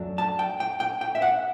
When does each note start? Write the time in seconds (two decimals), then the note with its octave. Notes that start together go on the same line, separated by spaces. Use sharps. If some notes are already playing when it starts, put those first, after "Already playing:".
Already playing: F#2 F#3 A3 D4
0.18 A5
0.39 G5
0.60 G5
0.80 G5
1.01 G5
1.15 E5
1.22 F#5